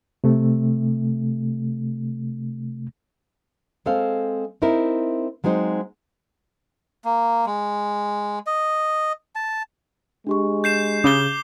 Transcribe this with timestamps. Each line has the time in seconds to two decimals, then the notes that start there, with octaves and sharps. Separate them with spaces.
0.24 C3 A3
3.86 G#3 C4 A4 C5 F5
4.62 C4 D#4 E4 A#4
5.44 F#3 G#3 C4 D#4 C5
7.05 A#3
7.46 G#3
8.47 D#5
9.35 A5
10.27 G#3 D4 G4 C#6
10.64 G6 C7 E7
11.04 C#3 D6 G7